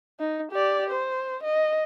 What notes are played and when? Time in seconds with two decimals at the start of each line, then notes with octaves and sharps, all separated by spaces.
0.20 D#4
0.52 G4 D5
0.90 C5
1.43 D#5